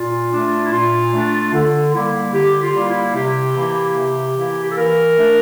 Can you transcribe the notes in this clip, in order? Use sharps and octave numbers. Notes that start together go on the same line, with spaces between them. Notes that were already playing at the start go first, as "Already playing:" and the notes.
Already playing: A#2 F4
A3 D4
E4
A#2 F4
A3 D4
D3
G3 A#3 E4
D3 G4
F4
G3 A#3 E4
E4
C3 G4
E3 A#3 E4
C3
E3 A#3 E4
G4
A4
E3 A#4
A3 D4